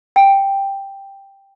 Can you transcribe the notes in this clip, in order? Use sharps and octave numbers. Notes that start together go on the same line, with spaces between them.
G5